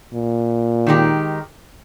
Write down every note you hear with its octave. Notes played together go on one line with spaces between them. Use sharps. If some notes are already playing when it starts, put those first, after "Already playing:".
A#2
D#3 G#3 D#4 G4